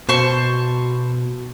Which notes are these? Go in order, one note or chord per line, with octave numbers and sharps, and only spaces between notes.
B2 C5 A5 C#6